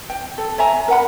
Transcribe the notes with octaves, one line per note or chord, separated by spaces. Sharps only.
G5
A4
C#5 E5 G#5 A#5
A#4 F#5 B5